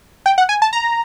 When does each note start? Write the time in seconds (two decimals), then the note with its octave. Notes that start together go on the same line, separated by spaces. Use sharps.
0.26 G5
0.38 F#5
0.49 G#5
0.62 A5
0.73 A#5